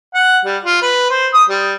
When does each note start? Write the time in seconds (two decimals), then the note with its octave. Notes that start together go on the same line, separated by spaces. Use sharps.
0.15 F#5
0.45 G3
0.65 F4
0.82 B4
1.10 C5
1.34 D#6
1.50 G3